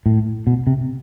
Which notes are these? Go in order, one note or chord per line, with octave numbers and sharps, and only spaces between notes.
A2
B2
C3